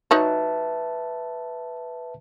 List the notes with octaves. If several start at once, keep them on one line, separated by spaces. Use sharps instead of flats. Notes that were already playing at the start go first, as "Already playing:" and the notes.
D#4 F#4 B4 C#5 E5 A5